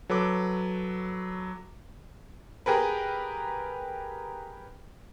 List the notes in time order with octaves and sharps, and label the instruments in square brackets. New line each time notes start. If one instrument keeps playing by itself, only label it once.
[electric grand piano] F#3 A4 B4 D6
[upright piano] G4 G#4 A#4 B4